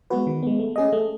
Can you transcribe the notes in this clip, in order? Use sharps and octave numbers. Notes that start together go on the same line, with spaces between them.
G#3 B3 F#4 B4
D#3
G#3 B3
A3
C#4 G#4 D#5
A3